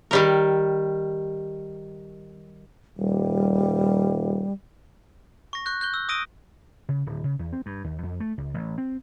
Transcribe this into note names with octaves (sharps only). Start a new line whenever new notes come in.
D#3 G3 A#4
D#1 G3
C#6 A#6
C#6 F#6 G6
F#6 G6 G7
E6
D#6 E6 A#6 D7 D#7 G7
C#3
D1
C#3
E2
C4
G2
D#2
F2
A3
C#2
A1
C4